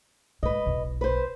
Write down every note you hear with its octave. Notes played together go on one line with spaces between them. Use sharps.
G#2 B4 D#5
E1 B1
B4 C5